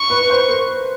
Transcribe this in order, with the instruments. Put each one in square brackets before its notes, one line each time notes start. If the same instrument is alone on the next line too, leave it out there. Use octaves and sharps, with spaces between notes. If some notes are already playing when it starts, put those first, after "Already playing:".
Already playing: [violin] C#6
[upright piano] B4
C5
A#4